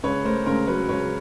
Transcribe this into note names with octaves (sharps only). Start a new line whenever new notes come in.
C#2 B4 C#5
A3 A#4 C5
C#2 A#4 C5
F#3 B4 C#5
C#2 B4 C#5